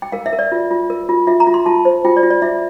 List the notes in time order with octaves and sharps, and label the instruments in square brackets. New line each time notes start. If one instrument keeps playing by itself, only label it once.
[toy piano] G5
A#4 F5
E5
A#4
D5
F4
F4
A#4
F4
F4 E5
A#5
F4
C6
F4 A5
C5
F4 G5
D5
F4
D5
F4 E5